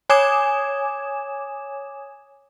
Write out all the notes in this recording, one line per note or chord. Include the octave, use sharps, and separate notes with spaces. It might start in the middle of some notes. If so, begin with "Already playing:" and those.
C#5 G#5 D6 D#6 G#6 E7